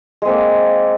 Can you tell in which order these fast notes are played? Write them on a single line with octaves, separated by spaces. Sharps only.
G#3 C4 A#3